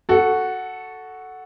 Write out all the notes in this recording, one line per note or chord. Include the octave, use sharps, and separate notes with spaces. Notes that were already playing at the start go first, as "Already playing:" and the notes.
F#4 A4